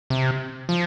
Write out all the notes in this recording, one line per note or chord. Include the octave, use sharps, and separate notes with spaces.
C3
F3